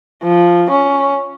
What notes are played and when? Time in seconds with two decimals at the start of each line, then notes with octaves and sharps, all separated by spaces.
0.24 F3
0.70 C#4